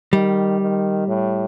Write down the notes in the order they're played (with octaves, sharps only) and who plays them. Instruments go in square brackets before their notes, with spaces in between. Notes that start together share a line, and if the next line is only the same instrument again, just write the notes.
[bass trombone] D#3 [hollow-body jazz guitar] G3
[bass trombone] D#3
A2